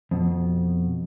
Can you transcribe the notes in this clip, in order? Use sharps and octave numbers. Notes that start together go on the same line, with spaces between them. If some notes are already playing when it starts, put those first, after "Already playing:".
F2 B2